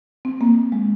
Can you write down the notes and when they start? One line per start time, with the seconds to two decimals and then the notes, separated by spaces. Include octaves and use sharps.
0.25 C4
0.41 A#3
0.72 G#3